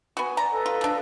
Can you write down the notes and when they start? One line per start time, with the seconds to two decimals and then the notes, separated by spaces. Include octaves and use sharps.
0.17 B3 F#4 G#5
0.37 D5 A#5
0.51 A4 B4 D#5
0.66 F4
0.81 F3 D4